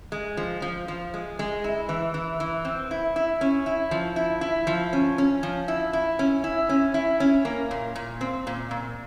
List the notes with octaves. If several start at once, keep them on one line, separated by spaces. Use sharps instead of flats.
G#3
F3
F3
F3
G#3
G#3
E4
E3
E3
E3
C4
E4
E4
C#4
E4
F3
E4
E4
F3
C#4
C#4
F3
E4
E4
C#4
E4
C#4
E4
C#4
A#3
A#2
A#2
C4
A#2
A#2